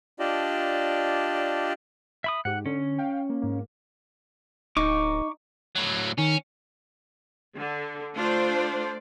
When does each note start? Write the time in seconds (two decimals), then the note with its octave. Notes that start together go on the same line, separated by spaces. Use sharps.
0.19 D4 F4 G4 D5 D#5 A5
2.24 E5 B5 D#6
2.45 G#2 G4 F#5
2.66 D3 C#4
2.98 F5 G5
3.29 A#3
3.42 G#2 A#3
4.77 D1 D#4 C#6 D6
5.76 A2 F#3
6.18 D#3 C#4
7.56 D3
8.15 A3 D4 F4 C5 D5